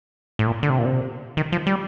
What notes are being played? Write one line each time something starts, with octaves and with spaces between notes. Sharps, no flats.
A2
A#2
D3
C3
A#2
C3
D#3
F3
G3